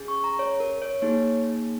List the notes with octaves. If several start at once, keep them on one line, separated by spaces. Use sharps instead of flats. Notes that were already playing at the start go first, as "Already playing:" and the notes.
Already playing: C#4 G#4
C#6
A#5
C#5
A#4
C#5
A#3 D#4 G#4 C#5